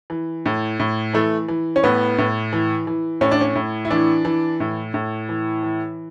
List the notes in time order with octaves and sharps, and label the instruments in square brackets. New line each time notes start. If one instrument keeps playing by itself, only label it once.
[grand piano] E3
A2
A2
E3 A3
E3
C#4
A2 B3
A2
E3
E3
A2 C#4
D4
C#4
A2
E4
E3 D4
E3
A2
A2
E3
E3